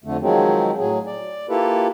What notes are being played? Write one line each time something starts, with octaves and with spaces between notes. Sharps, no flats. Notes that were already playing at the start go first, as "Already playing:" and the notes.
F2 D3 A3
D#3 F3 F#3 G#3 C4
A2 F#3 G#4
D5
A#3 E4 F4 G4 A4 B4